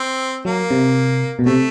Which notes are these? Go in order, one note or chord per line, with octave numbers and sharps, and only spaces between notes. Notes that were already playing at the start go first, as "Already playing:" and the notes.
Already playing: C4
F#3 A#3
C3
B2
C3 A3